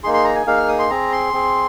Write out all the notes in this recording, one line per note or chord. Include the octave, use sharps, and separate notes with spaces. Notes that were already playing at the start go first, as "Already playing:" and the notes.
A#3 D#4 G#4 C6
C6
A#5
G#5
A#3 D#4 G#4 F5
F6
D#6
C6
C4 G#4 A#5
C6
C4 G#4